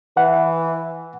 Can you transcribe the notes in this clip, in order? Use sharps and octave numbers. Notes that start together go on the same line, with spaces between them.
E3 F#5